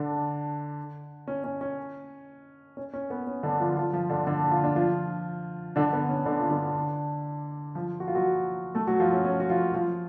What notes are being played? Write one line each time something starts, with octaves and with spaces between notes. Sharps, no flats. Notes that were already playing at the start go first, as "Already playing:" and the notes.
Already playing: D3 D4
C#4
C#4
C#4
C#4
C#4
B3
C#4
D3 D4
F3 F4
F3 F4
F3 F4
D3 D4
D3 D4
F4
D4
F3 F4
D3 D4
B3
C#4
D3 D4
F4
D3 D4
F3 F4
F#4
F4
F#3 F#4
A3 A4
F#3 F#4
F3 F4
C#4
C#4
F#4
F3 F4
F3 F4